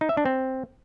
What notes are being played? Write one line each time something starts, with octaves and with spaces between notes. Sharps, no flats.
D#4
E5
D4
C4